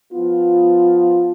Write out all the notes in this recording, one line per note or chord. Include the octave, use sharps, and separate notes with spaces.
F3 B3 F4